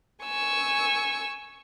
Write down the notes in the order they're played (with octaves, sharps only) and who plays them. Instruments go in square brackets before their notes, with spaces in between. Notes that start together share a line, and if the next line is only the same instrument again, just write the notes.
[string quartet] G#5 C#6 E6